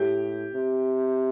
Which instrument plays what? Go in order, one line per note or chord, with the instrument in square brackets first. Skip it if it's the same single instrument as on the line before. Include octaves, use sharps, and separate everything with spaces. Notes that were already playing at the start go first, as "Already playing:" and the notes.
Already playing: [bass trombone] A2 [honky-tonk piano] G4
[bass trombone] C3